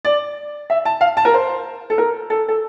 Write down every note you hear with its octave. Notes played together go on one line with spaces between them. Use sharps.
D5
E5
A5
F5
A5
A#4
C5
A4
A#4
A4
A4